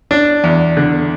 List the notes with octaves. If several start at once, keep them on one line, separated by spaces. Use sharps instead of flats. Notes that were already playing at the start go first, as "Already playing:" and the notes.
D4
E2
D3